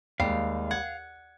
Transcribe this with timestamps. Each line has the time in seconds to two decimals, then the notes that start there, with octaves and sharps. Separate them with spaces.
0.20 D#2 G3 G#3 F5
0.71 F#5 G#6